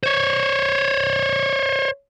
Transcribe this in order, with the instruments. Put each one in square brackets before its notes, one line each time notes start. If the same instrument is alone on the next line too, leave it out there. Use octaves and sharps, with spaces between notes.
[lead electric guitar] C5 C#5